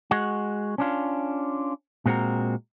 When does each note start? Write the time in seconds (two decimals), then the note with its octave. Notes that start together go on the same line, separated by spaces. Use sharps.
0.11 G#3 F#4
0.78 C#4 D4 F4
2.06 A#2 G#3 C4 D#4 F#4 A#4